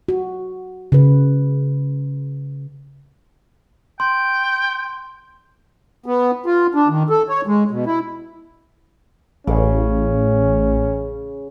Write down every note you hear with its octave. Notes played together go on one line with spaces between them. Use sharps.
F#4
C#3 B4
G5 C6
B3
F4
D4
D#3
A4
C#5
G#3
B2
E4
A1 C#3 C#4